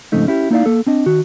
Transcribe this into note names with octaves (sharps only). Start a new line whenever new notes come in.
F2 G#2 C#3 A3 D#4
C#4 E4 G4
A#3 D#4 E4 C#5 D5 F5
A#3 A4
C4 D4 D#5
D#3 F#4